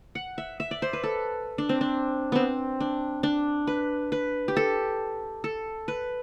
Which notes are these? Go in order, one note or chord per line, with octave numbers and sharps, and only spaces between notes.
F#5
E5
E5
D5
C5
B4
A4
D4
C4
D4
B3 C4
D4
D4
B4
B4
G4
A4
A4
B4